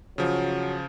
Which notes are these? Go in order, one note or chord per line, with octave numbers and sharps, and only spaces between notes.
C#3 F3 F#3